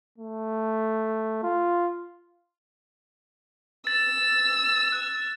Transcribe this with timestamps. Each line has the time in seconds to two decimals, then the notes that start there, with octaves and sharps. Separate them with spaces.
0.18 A3
1.43 F4
3.87 E6 A6
4.92 F#6